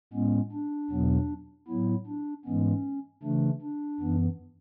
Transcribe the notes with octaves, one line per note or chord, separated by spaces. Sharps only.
A2 G#3 B3 C#4
D4
E2 B2 F#3 B3
A2 F#3 B3 E4
D4
G#2 E3 G#3 B3 C#4
C#3 E3 A3 D4
D4
F#2 E3 B3